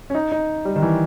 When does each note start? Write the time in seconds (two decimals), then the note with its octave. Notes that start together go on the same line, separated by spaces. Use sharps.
0.10 C#4
0.15 D#4
0.32 D#4
0.65 G3
0.76 D#3
0.82 E3